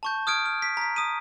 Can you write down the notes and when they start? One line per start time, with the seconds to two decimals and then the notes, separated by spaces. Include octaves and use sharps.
0.03 A5 C#6 G6
0.27 D#6 F6 G#6 D7
0.46 F6
0.62 B6
0.77 A#5 B6
0.96 D#6 D#7